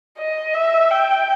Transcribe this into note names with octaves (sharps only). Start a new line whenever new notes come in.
D#5
E5
G5